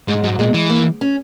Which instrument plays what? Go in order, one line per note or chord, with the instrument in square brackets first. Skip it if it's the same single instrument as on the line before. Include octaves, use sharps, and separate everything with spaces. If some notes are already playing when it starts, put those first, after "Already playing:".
[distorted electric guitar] G#2 [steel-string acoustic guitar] G#3
[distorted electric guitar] G#2 [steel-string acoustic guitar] F#3
[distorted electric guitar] A#2 [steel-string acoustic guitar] G#3
[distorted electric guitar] E3 [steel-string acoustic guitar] G#3
[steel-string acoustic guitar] A#3
C#4